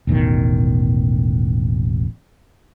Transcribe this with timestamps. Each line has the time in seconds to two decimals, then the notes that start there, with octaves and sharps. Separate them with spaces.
0.07 E1 A1 B2 D#3